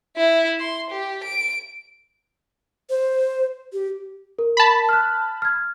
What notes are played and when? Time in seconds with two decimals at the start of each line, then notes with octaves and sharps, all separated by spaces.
0.17 E4
0.60 C6
0.90 G4
1.24 D7
2.90 C5
3.73 G4
4.39 A#4
4.57 A5 B5
4.89 F6 F#6
5.42 F6 G#6